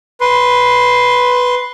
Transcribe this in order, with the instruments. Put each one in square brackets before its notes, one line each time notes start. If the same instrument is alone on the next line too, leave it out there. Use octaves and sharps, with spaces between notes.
[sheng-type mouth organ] B4 C6